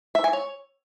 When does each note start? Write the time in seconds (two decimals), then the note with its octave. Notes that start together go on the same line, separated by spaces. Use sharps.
0.15 E5
0.24 G#5
0.33 C#5